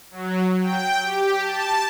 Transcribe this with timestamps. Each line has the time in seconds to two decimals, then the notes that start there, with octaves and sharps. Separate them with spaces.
0.11 F#3
0.61 G5
1.02 G4
1.40 A5